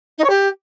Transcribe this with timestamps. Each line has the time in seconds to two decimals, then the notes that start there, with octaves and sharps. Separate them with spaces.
0.18 D#4
0.24 C#5
0.29 G4